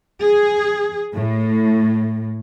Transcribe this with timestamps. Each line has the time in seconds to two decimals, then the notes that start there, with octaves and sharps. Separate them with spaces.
0.23 G#4
1.15 A2